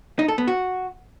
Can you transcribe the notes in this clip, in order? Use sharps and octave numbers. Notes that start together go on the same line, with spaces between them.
D#4
A4
B3
F#4